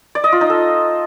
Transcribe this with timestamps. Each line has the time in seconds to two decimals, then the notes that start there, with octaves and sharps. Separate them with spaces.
0.15 D5
0.24 D#5
0.32 F4
0.41 D#4
0.50 A4